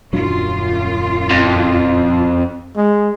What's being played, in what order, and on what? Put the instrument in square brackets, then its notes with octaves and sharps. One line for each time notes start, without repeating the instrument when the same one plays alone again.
[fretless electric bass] D#1 F#3 D4 [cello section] F#2 F4
[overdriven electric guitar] F2
[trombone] G#3